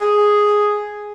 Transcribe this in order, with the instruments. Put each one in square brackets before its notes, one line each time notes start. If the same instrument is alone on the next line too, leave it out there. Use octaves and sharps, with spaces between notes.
[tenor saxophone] G#4